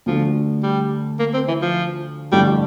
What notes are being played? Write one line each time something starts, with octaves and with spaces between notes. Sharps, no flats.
D2 D3 F3 A3 D4 A4
G3
A#3
C4
E3
F3
A1 G2 D3 F3 G3 A3